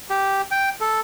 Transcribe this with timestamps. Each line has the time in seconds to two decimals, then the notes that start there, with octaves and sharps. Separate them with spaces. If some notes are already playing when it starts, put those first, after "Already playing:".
0.10 G4
0.51 G5
0.81 A4